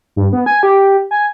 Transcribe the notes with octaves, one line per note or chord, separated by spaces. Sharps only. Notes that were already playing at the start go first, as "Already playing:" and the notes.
G2
B3
G#5
G4
G#5